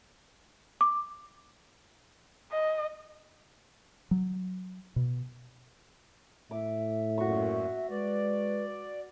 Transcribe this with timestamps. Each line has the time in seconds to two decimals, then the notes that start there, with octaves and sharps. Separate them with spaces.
0.81 D6
2.52 D#5
4.11 F#3
4.96 B2
6.51 A2 E5 D6
7.18 F#2 A#2 F#4 C#6
7.90 G#3 B4 D5